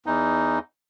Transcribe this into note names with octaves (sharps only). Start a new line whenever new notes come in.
E2 D#4